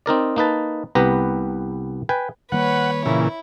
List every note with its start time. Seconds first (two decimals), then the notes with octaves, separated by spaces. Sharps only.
0.06 C4 D#4 A#4 D5
0.36 A#3 D#4 B4 A5
0.95 C2 B3 G4 B4 A#5
2.09 B4 G5 G#5
2.52 D#3 G3 A#3 B4 C#5 F#5
3.06 A#2 C#3 E3 E4